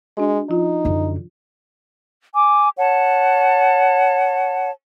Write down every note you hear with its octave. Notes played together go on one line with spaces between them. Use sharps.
G#3 D4 F#4
F3 D#4 F4
F#2 D3
G#5 D6
C#5 F#5 A5